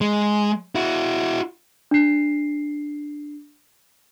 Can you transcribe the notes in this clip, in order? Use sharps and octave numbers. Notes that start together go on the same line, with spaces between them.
G#3
E4 F#4
D4 C7